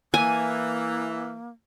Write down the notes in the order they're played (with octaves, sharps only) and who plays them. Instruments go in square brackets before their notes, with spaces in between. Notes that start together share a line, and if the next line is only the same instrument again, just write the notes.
[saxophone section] E3 [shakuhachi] A#3 [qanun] G#5